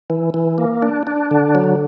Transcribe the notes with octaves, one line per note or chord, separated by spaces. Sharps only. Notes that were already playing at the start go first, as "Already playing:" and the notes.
E3
E3
A#3
D4
D4
D3
F#3